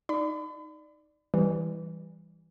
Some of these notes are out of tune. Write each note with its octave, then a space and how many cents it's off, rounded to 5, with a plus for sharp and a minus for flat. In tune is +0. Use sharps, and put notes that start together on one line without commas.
D#4 +0 D5 +10 B5 +40
E3 +0 G3 +0